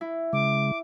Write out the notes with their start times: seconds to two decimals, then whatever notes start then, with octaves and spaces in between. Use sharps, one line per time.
0.01 E4
0.33 C#3 G#3 D6